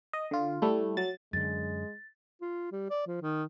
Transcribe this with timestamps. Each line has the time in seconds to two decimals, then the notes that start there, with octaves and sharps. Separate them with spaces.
0.13 D#5
0.31 D3 F4
0.62 G3 A3 E4
0.97 F#3 A6
1.33 F#2 D3 G#3 A6
2.42 F4
2.72 G3
2.90 D5
3.07 F3
3.22 D#3